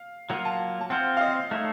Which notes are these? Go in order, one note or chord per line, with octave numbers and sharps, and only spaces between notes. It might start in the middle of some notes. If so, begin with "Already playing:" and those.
Already playing: F5
F#3 A#3 F4 F#5
A5
A5
C4 F4 C5 F#5
F5
D#5
A3 D#4 A4 C#5